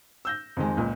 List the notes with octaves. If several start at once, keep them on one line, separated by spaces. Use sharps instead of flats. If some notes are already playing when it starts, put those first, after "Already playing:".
E6 G6 A#6
F2 D#3 G#3
C#2 A#2